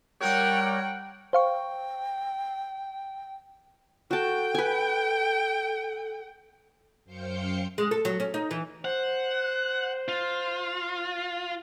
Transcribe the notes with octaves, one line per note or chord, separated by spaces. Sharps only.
G3 A#4 C#5 F#5 G5
C5 F5 G5 C#6
F#4 A4 G5 A5
B4 G#5
F#2 C5 F5 G5 G6 C#7
G#3
A4
F#3
C#4
D#4
E3
C5 F#5
F4